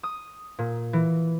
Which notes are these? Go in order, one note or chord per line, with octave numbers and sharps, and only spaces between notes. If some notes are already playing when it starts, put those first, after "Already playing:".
D#6
A#2
E3